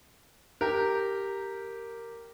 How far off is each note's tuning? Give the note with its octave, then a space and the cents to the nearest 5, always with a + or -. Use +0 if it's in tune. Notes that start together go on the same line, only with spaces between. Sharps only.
G4 -5 A#4 -10